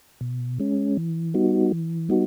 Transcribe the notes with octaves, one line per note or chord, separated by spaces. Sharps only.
B2
G#3 C#4
E3
G3 B3 D#4 F#4
E3
G3 B3 D#4 F#4